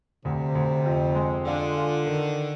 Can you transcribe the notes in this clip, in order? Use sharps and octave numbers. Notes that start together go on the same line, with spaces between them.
D2 C3
D2
F2
G#3
D3 F4
F4
D#3